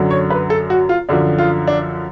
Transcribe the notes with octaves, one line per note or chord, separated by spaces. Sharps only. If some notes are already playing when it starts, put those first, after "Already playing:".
Already playing: F#2 D3 F#3
C#5
B4
A4
F#4
F4
F#2 D3 F3 D4
F4
D4